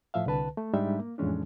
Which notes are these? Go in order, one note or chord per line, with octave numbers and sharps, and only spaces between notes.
A2 F3 E5 F5
C2 D3 B4 A5
A3
G#2 G3 G#3 D4 D#4 E5
A#3
F2 A2 E3 G#3 C#4 D4